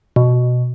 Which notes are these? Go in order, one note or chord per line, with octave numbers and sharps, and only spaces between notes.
B2